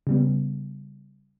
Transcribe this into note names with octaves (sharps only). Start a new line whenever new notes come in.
C#3 G3 B3